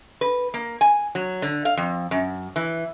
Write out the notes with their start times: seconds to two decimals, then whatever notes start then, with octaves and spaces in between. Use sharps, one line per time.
0.21 B4
0.54 A#3
0.81 G#5
1.15 F#3
1.42 D3
1.65 F5
1.77 F2
2.11 F#2
2.56 E3